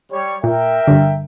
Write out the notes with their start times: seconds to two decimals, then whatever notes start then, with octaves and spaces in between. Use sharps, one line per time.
0.12 G3 C#5
0.44 A#2 A#4 E5 G5
0.87 G2 D3